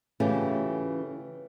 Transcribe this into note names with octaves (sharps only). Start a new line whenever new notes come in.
C#3 E3 A3 C#4 F4 G4